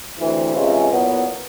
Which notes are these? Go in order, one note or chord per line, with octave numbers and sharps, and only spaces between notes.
D2 C3 E3
C3 E3 G#3 C#4 F4
A#2 F#3 B3 E4